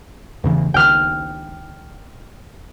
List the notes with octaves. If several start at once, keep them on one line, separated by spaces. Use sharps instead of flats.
E2 C#3 E3
C#2 D#3 G5 F6